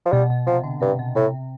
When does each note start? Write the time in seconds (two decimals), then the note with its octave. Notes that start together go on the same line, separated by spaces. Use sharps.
0.06 F3
0.12 B2 G3
0.30 B2
0.47 C3 F3
0.64 D3
0.81 G2 C3
0.99 B2
1.15 A2 C3